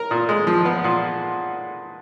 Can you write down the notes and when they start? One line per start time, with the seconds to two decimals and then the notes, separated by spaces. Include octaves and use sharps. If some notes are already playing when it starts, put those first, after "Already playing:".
Already playing: A#4
0.11 A#2
0.29 G#3
0.47 F3
0.65 B3
0.84 A#2